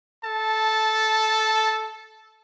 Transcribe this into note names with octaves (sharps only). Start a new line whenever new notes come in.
A4 A5